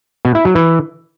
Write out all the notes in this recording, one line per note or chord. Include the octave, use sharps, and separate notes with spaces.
B2
E4
F#3
E3